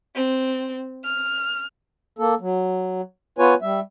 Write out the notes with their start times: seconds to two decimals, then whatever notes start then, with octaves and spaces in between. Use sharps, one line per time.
0.15 C4
1.04 F6
2.19 A#3 A4
2.41 F#3
3.38 B3 F4 B4 C#5 G#5
3.62 G3 E5